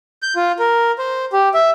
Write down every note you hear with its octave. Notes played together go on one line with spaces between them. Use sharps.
G6
F4
A#4
C5
G4
E5